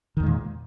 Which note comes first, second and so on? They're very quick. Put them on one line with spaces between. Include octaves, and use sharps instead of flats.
D#3 E2 G#3 A#2